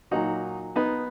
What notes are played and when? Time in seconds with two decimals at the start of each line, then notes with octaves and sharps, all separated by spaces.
0.11 A#2 F#3 A#3 D#4 F#4
0.76 B3 D#4